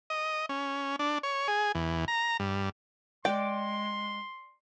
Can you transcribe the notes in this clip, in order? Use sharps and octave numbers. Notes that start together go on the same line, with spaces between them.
D#5
C#4
D4
C#5
G#4
E2
A#5
G2
G#3 D5 G5 C6